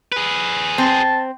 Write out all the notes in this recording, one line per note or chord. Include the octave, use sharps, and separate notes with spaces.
G#4 B4
C4 A5